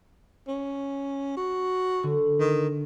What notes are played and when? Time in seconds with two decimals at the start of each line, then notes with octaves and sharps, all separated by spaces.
0.48 C#4
1.37 F#4
2.03 D3
2.39 D#3